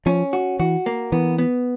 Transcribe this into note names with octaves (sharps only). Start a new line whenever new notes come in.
F3 C#4
F#4
E3 F#4
A#3
E3 B3
B3